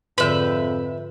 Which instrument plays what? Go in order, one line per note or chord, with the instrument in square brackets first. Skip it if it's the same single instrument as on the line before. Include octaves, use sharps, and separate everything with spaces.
[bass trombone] F2 [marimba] G#2 D3 [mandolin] B4 E5 G5